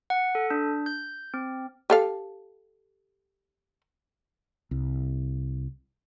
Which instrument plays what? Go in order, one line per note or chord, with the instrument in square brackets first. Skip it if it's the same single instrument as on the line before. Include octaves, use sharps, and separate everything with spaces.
[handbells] F#5
A4
D4
G6
C4
[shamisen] G4 A4 F5
[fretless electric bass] C2